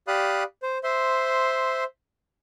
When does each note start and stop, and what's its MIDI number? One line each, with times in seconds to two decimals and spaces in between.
0.08 0.43 67
0.08 0.43 74
0.08 0.43 77
0.08 0.43 83
0.08 0.43 87
0.08 0.43 90
0.62 0.78 72
0.84 1.84 72
0.84 1.84 76
0.84 1.84 84